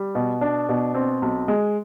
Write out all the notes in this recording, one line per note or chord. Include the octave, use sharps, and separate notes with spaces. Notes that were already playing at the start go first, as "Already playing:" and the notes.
Already playing: G3
B2
D4
B2
C4
B1
G#3